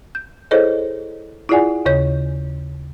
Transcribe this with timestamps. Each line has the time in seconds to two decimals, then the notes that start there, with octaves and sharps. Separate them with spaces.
0.15 G6
0.51 E4 G#4 A4 C5 C#5 D#5
1.49 E4 F4 G#4 D5 F#5 G#5
1.85 D#2 C#3 C#5 G6